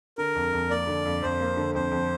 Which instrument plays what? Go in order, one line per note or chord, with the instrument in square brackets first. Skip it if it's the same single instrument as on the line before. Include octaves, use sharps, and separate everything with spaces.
[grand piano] D3 [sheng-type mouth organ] A#4
[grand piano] F2
F2
[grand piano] A#3 [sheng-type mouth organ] D5
[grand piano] D3
F2
[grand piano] F2 [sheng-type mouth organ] C5
[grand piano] A#3
D3
[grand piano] F2 [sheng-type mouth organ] C5
[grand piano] F2